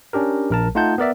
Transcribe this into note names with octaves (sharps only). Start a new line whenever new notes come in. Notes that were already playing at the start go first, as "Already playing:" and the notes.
C#4 D4 G4 A#4
A#1 A#4 A5
A3 D#4 F4 F#5 A5 G6
B3 A#4 D5 E5